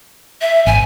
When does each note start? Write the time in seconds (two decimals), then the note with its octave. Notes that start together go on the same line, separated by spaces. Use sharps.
0.41 E5
0.67 G#1 G#5